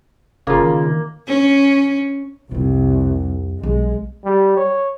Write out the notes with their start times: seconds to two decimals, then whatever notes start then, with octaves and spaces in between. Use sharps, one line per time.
0.47 F#1 C#3 A#3 F4
0.63 D#3
1.27 C#4
2.51 C2 F2 F4
3.63 B1 B2 G#3
4.24 G3
4.57 C#5